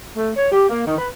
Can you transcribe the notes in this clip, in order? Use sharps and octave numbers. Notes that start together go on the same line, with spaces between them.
A3
C#5
G4
A#3
D#3
B4